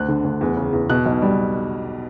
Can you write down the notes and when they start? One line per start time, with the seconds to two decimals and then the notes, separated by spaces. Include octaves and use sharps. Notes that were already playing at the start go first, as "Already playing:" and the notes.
Already playing: D2 F#6
0.08 D3
0.24 D2
0.41 E2
0.57 C#3
0.73 E2
0.90 B2 F#6
1.06 B1
1.22 G3